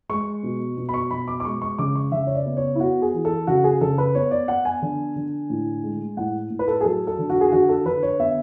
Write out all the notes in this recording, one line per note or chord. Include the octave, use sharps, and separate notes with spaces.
G#3 C#6
B2
B2
B5
C#6
B2 B5
D6
D6
G#3 C#6
C#6
C#3 D6
C#6
C#3 E5
C#5
D5
B3
C#5
E4
B3 F#4
G#4
E3
A4
C#3 F#4
G#4
C#3 A4
B4
B3 C#5
D5
B3 F#5
G#5
D3
D3
A2
G#3
A2 F#5
A2
B4
A4
G#4
F#3 A4
A4
D3
F#4
G#4
D3 F#4
A4
D3 B4
C#5
B3 E5